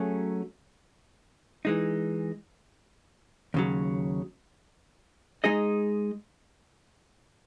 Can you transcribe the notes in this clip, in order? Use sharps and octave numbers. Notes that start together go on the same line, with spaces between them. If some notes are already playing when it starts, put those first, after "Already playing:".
Already playing: F#3 A3 C#4 G#4
E3 G#3 D#4
D#2 C#3 F#3
G#3 D#4 G#4 D#5